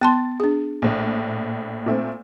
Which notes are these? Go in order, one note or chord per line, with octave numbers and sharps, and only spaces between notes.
B3 A5 C6 A6
D4 G#4
A#1 A2
A#2 A3 C4